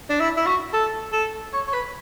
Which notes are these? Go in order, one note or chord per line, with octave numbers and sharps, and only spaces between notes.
D4
E4
E4
F#4
A4
A4
C#5
C#5
B4